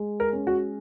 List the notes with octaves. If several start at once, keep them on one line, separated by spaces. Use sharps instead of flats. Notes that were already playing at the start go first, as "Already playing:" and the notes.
Already playing: G#3
A#4
C#4
F#4